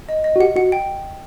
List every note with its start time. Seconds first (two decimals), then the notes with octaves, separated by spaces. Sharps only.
0.09 D#5
0.24 D#5
0.36 F#4
0.40 G4 F#5
0.56 F#4 F#5
0.72 G5